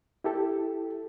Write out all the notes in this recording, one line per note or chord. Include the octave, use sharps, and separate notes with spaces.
E4 G4 A4